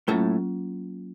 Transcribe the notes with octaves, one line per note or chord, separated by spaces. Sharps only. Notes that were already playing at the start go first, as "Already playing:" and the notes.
A2 F#3 A3 A#3 C#4 F4